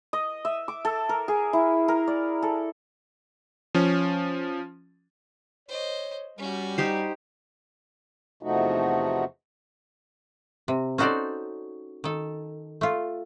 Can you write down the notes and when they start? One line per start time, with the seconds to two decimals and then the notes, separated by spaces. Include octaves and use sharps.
0.13 D#5
0.45 E5
0.68 D6
0.85 A4
1.09 A#4
1.28 G#4
1.53 E4
1.88 A#4
2.08 D5
2.43 A4
3.75 F3 C#4
5.68 C5 C#5 D#5
6.38 G3 C#4 F#4
6.78 D#4 G4 C5
8.43 E2 C3 F3 A3 D#4 F#4
10.68 C3
10.98 C#4 D#4 F#4 A4 C5 D5
12.04 D#3 A4
12.81 A3 F4